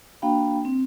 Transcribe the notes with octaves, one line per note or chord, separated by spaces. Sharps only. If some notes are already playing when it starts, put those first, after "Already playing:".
A#3 D4 F#4 F5 G5 B5
C4